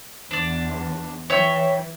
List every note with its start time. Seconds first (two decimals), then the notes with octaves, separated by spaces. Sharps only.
0.31 E2 D4 D5
1.30 E3 C#5 E5 G5